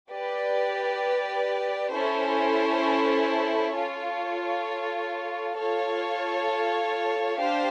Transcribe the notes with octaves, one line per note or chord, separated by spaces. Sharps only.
G4 B4 D5
C#4 E4 A4 C5
F4 A4 C#5
F4 A4 C#5 F5
D4 G4 C5 F5